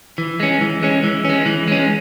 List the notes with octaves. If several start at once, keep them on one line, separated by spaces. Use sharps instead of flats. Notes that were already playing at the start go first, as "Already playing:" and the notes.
E3
G#3 C#4
E3
G#3 C#4
E3
G#3 C#4
E3
G#3 C#4